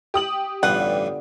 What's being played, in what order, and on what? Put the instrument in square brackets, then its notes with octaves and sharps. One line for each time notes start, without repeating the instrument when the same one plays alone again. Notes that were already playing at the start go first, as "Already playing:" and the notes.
[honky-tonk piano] G4 D#6 F#7
[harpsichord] A1 G2 B4 [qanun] D3 B3 F4 [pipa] F#5